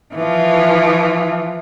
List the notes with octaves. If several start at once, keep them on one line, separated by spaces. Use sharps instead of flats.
E3 F3